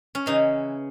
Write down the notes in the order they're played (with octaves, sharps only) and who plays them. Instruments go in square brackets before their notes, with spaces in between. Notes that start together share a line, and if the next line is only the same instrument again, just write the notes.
[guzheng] C#4
C#3 E3 D#4